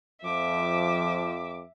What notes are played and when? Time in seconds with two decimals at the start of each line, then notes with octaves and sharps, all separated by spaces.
0.25 F2 F3 E5 D6